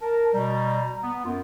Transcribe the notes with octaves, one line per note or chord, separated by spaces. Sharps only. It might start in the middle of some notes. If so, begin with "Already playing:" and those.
A#4 A5
B2 G3 A#5
B3
F#2 B3 F4